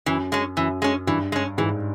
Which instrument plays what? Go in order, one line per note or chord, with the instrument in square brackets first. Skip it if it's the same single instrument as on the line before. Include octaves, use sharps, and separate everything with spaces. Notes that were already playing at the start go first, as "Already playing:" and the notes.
[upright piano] F#2 [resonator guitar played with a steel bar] E3
[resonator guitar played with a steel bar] G#3 C#4
[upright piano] F#2 [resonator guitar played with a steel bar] E3
[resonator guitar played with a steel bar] G#3 C#4
[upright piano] G2 [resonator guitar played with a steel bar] E3
[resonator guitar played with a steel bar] G#3 C#4
[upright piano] G#2 [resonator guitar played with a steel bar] E3